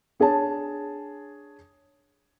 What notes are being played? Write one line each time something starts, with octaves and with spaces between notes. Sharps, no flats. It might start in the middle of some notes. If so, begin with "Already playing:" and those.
D4 G#4 C#5 A5